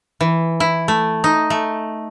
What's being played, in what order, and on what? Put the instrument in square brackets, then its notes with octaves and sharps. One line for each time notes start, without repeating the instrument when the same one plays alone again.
[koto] E3
E4
A3
D#4
A3